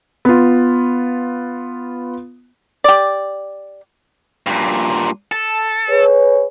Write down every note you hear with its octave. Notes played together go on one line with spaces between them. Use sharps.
B3 F4
G4 D5
G2 A#2
A4
G#4 B4 C#5